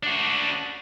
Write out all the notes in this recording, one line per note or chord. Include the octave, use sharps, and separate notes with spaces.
D4 F#4